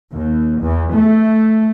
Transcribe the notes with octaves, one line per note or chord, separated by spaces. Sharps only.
D#2
E2
A3